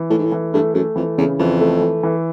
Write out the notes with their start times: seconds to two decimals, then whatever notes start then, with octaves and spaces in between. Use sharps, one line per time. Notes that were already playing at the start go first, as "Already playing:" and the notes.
Already playing: E3
0.10 A2 A3
0.18 G#2
0.25 A2
0.32 E3
0.54 G2 A3
0.74 F#2 A3
0.96 F2 E3
1.18 E2 C#3
1.39 F2 E3
1.61 A3
1.82 E3
2.03 E3